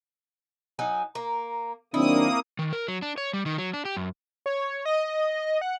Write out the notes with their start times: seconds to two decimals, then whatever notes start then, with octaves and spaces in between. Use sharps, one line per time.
0.79 F#3 D#4 G#5
1.15 A#3 A#5
1.94 D#3 F#3 A#3 C4 D4 E4 D#6
2.59 D#3
2.73 A#4
2.88 F#3
3.02 D4
3.18 C#5
3.33 G3
3.46 D#3
3.58 F#3
3.74 D4
3.85 G4
3.97 F#2
4.46 C#5
4.85 D#5
5.61 F#5